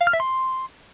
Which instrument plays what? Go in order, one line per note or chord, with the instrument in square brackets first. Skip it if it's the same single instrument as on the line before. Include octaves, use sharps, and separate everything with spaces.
[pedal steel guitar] F5
F6
E5
C6